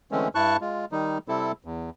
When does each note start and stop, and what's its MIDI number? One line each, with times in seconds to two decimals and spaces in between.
0.11 0.28 50
0.11 0.28 52
0.11 0.28 56
0.11 0.28 57
0.11 0.28 60
0.11 0.28 61
0.35 0.57 43
0.35 0.57 64
0.35 0.57 81
0.35 0.57 85
0.35 0.57 90
0.61 0.85 56
0.61 0.85 65
0.92 1.18 51
0.92 1.18 55
0.92 1.18 63
1.28 1.52 48
1.28 1.52 55
1.28 1.52 60
1.28 1.52 64
1.28 1.52 69
1.65 1.90 40